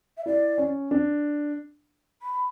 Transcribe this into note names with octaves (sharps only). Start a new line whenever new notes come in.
E5
E4 D5
C#4
D4
B5